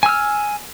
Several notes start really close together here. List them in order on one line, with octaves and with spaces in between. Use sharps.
G#5 E6 F6